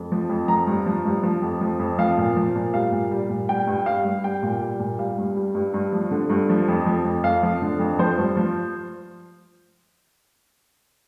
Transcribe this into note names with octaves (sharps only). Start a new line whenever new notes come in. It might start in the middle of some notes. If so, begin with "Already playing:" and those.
Already playing: F2
F3
F2
F3 A#5
G2
F3
G2
F3
F2
F3
F2
F3 F5
A#2
F3
A#2
G3 F5
A#2
G3
A#2
G3 G5
G2
G3 F5
G2
G3 G5
A#2
G3
A#2
G3 F5
G2
G3
G2
G2
F3
D3
G2
F3
F2
F3
F2
F2 F5
F3
D3
F2
F3 C5
G2
F3